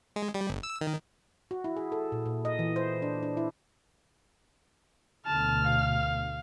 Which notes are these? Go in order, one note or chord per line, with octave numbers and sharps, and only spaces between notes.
G#3
G3
G1
E6
D#3
F#4
E4
G#4
A4
A#2
A#2
D#5
E3
C5
D4
D4
E4
D2 B2 D3 A5 F6
F5